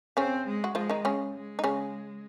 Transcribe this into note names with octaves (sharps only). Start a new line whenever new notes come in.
C#3 C4 C#4
G#3
F#4
F3 G#3 F4
D#3 D#4
C#3 C#4
G#3
D#4
C#3 C#4